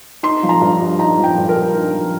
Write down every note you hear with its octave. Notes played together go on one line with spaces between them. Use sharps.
D#4 C6
F3
A#5
G2
G2
D#4 A#5
F3
G5
G2
A#4
G2
D#4
F3